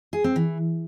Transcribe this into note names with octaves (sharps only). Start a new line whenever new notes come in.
G#4
C4
E3